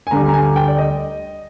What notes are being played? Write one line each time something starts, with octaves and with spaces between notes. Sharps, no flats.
G#5
D2 D3 G3 A#5
A#5
G#5
G5
D5
D#5